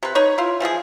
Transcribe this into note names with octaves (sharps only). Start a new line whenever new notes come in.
C3 B4
D#4 B4 C#5
E4 F4
E3 F3 F#4 G#4